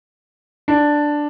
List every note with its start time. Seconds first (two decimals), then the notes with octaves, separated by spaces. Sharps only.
0.68 D4